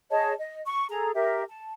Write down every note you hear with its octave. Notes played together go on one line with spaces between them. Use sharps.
G#4 C#5 D#5 A5
D#5
C#6
G#4 A4 A#5
G4 A#4 E5
A5